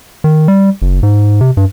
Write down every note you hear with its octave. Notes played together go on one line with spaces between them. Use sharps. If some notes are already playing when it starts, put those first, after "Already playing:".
D#3
G3
F#1
G#2
C3
G2